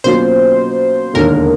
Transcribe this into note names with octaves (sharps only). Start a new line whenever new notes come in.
B2 F#3 A#3 C#4 F4 C5
E1 D#2 D3 A#4